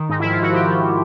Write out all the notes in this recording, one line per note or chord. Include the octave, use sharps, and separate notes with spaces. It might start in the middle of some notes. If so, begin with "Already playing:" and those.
Already playing: D#3
G#2 D#4
E4
F3
F4
G#2 F#4
F3 G4
F3
F3